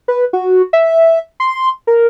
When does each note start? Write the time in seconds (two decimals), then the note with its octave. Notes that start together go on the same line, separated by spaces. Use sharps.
0.08 B4
0.33 F#4
0.73 E5
1.40 C6
1.87 A#4